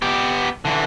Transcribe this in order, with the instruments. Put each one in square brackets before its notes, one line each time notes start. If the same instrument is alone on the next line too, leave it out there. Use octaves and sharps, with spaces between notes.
[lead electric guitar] B3 G4
D3 E3